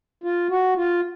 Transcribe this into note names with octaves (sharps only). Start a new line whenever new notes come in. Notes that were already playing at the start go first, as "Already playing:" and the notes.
F4
F#4
F4